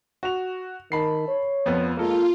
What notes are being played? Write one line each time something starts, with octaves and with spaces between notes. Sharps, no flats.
F#4 F7
D#3 A5 B5 C7
C#5
F2 F3 B3
G#3 A#3 F4 A4